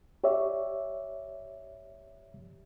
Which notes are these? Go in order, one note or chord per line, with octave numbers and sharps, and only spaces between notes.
G4 C#5 D5 E5